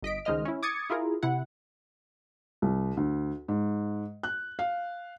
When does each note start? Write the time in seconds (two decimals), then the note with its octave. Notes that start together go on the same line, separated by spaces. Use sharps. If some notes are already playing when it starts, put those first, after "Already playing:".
0.03 G1 D#5 B6 D7
0.25 C#2 D#3 G#3 C5 D#5 F6
0.45 C#4 E4
0.63 D6 D#6 G#6 A6 C#7
0.90 E4 F4 G#4 A#4
1.23 C3 E4 F#5
2.62 C2
2.97 D2
3.48 G#2
4.23 F#6
4.59 F5